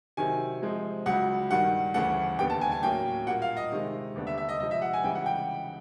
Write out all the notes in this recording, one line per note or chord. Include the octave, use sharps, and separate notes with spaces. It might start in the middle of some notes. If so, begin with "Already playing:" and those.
C3 D#3 F#3 G#5
C3 F3 G#3 C4
C#2 C#3 F#3 F#5
G2 D#3 G3 F#5
D2 C#3 E3 A3 F#5
D#2 D3 G3 B3 G5
A5
G#5
G#5
A2 F#3 A#3 C#4 G5
A#2 G3 A#3 F#5
F5
D#5
C3 D#3 G#3
D#2 D3 G3 B3 D4
E5
E5
D#5
C#2 C3 F3 D#5
E5
F#5
G#5
C#2 C#3 E3 G3 G5
F#5
G5